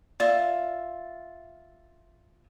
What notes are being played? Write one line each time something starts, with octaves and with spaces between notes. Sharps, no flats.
F4 D5 E5